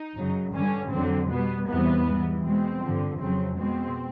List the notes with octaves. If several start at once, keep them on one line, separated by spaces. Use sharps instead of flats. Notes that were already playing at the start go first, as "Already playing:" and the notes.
Already playing: D#4
F#2 C#3 F#3
G2 D3 G3 C#4
F2 D3 F#3 C4
B2 G3 B3
E2 C3 E3 G3 B3
G#2 E3 G3
B2 G#3 C4
G2 D3 F3
F2 C#3 F#3 C4
B2 G#3 C4